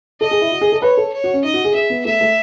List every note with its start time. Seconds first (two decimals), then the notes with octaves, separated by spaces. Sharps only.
0.21 A4 D#5
0.31 G#4
0.41 E4
0.51 F#4
0.61 G#4
0.72 A4
0.82 B4 C#5
0.97 A4
1.14 C#5
1.24 F#4
1.33 C#4
1.44 D#4 D#5
1.54 F#4
1.64 G#4
1.75 G#4 E5
1.90 B3
2.05 A3 E5
2.21 A3